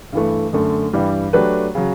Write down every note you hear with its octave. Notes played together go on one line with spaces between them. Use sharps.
G2 E3 A3
F#2 D3 A3
G2 E3 G3
F#3 A3 D4 G4 B4
C#3 F#3